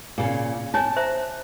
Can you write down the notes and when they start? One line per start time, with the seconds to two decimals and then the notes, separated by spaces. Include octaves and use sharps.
0.18 A#2 C#3
0.74 D#4 C#5 G#5 A5
0.96 C5 E5 A#5